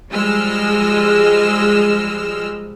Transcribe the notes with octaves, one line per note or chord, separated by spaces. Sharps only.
F3 G3 G#3 D#5 E6 F6